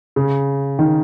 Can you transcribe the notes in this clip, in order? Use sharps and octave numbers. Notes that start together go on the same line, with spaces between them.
C#3
D#3